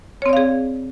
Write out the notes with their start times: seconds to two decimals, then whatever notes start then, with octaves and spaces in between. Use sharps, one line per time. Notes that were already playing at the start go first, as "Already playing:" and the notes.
0.22 C#5
0.26 C4
0.29 D5
0.33 F5
0.37 G#4